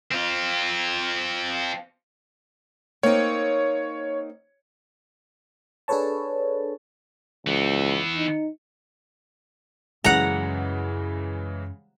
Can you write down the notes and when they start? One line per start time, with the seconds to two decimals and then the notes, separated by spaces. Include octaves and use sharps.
0.11 C4 F4
3.03 A#3 C4 D#4 C#5
5.88 D4 G#4 A4 B4 C#5 A5
7.47 C#2 E3 B3
8.16 D#4
10.04 F#2 C#3 E3 G#3 C#4 F#5 A#5